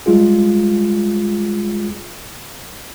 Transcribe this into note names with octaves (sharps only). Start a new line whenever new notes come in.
G3 G#3 F4 G#4